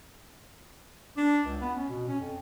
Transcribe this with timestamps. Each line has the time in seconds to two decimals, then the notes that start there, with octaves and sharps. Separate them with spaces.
1.17 D4
1.45 C#2
1.61 B3
1.76 C#4
1.89 B2
2.08 C#4
2.20 F2